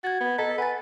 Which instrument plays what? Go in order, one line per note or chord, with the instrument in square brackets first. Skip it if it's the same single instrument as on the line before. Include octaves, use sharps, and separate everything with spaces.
[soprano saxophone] F#4 [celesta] G#6 A6
[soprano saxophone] B3
[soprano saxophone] A4 [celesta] D#5 A#5 B6
[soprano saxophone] B4 [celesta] F#5 G#5 A6